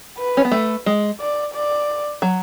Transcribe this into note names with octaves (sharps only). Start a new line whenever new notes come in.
B4
C#4
B3
A3
G#3
D5
D5
F#3